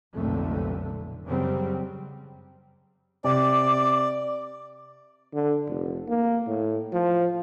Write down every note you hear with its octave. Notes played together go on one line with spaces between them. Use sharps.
F1 B1 F2 A#2 D3 A3
F#2 C#3 F#3 G3 C4
C3 D5 D6
D3
F1
A#3
A2
F3